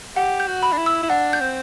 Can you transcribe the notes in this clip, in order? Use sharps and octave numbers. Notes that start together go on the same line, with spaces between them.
G4 F#5
G6
F#4
B5
D4
E4
E6
E4
D4 F#5
G6
C4